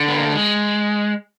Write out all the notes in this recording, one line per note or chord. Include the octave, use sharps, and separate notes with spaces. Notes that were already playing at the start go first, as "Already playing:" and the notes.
Already playing: D3
B3
A#3
A3
G#3